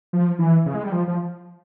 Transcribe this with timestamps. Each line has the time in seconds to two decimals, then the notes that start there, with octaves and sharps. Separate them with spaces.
0.13 F3
0.39 E3
0.66 C#3
0.75 G#3
0.84 G3
0.92 F3
1.07 F3